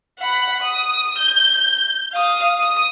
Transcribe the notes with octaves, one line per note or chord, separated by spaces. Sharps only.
F#5 B5
D#6
G6
F5 D#6
D#6